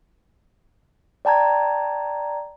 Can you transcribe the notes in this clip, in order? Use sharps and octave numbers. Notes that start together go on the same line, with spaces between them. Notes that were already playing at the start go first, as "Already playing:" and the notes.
D5 G5 A5 A#5 G#6